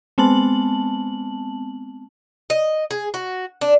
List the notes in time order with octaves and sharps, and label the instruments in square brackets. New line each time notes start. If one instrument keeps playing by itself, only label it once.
[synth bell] G#3 B3 C4 A5 F#7
[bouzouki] D#5
G#4
F#4
D4